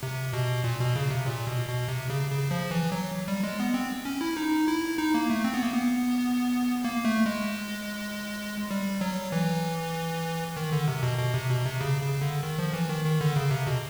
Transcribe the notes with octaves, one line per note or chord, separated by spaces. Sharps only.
C3
B2
A#2
B2
C#3
C3
A#2
B2
B2
C3
C#3
C#3
F3
E3
F#3
G3
G#3
B3
C4
C#4
E4
D#4
E4
D#4
A#3
A3
C4
B3
A#3
B3
A#3
A3
G#3
G3
F#3
E3
D#3
D3
C3
B2
B2
C3
B2
C3
C#3
C#3
D3
D#3
F3
E3
D#3
D#3
D3
C#3
C3
B2